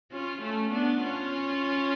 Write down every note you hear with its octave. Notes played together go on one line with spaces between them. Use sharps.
C#4 F4
A3 C#4
B3 D4
C#4 F4